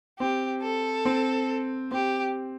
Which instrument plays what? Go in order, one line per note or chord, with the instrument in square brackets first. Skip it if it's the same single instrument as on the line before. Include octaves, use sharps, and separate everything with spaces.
[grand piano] C4 [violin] G4
[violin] A4
[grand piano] C4
[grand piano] C4 [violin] G4